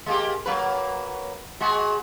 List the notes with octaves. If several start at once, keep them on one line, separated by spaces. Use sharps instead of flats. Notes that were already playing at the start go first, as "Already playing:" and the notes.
G#3 A#3 G4
F#3 A#3 B4
G#3 F#4 G#4